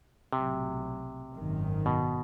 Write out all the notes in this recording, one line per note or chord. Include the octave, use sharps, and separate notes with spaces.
B1 A2 C3 F#3
G#1 F#2 D#3
B2